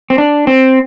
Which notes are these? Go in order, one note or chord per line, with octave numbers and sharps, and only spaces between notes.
C4
D4
C4